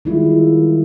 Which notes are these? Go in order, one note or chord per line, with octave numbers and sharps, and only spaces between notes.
D#3 G3 G#3 E4 F4